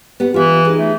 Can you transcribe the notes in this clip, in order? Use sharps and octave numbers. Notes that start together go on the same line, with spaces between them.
B3 G4 F#5
E3 F4 G4 E5
D#4 G#4
A3